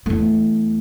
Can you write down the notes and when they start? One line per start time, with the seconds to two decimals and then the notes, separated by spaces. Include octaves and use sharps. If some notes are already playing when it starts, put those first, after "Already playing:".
0.06 E2 A3